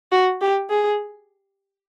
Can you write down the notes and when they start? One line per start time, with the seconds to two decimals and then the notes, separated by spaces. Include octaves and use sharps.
0.12 F#4
0.42 G4
0.70 G#4